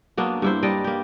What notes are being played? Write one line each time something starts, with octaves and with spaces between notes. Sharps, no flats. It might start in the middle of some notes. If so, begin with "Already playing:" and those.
F#3 A#3 B3 D4
G2 E4 C5
G3 D4 D5 D#5
A#3 G4